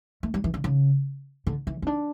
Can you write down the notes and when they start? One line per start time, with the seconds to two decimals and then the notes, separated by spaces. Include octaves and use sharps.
0.23 A3
0.34 G3
0.44 E3
0.54 D3
0.64 C#3
1.47 D3
1.67 E3
1.82 C#4
1.87 D4